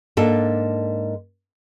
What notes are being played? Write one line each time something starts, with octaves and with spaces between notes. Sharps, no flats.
G#2 A#3 D4 A4